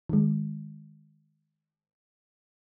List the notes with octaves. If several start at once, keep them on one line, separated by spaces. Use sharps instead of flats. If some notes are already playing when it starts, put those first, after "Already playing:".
D#3 G#3